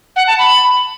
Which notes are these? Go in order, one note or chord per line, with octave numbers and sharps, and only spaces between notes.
F#5
A5
B5